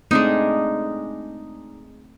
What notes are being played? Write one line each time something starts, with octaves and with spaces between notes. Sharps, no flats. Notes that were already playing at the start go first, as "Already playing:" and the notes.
G#3 A3 C4 D4 D#4